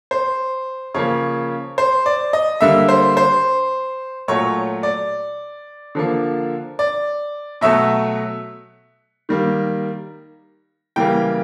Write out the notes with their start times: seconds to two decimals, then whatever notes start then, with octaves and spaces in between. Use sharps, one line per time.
0.11 C5
0.94 C#3 F3 A#3 C#5
1.78 C5
2.06 D5
2.33 D#5
2.61 D3 G3 A#3 E5
2.89 C5
3.17 C5
4.28 A#2 F#3 A3 C#5
4.83 D5
5.95 D3 F3 A#3
6.79 D5
7.61 B2 F#3 A3 E5
9.29 D#3 G3 A#3
10.96 C#3 E3 G3 A#3 G5